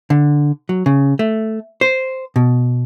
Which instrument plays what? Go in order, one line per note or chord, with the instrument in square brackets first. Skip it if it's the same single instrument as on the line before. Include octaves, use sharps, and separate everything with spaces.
[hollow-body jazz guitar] D3
F#3
C#3
A3
C5
B2